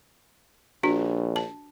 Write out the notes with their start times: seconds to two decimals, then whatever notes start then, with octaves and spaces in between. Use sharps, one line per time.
0.83 A#1 D4 F#4
1.36 A5